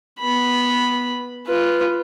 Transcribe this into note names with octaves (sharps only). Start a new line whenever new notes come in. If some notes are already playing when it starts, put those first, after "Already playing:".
B3 B5
F4 B4